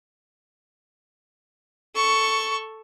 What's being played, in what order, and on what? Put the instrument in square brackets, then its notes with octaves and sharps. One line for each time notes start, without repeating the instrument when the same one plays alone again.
[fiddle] A4 C#6